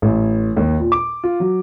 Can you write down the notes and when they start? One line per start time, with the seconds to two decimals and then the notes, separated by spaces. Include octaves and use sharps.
0.02 A1
0.57 D#2
0.80 A#2
0.92 D6
1.24 F4
1.40 F#3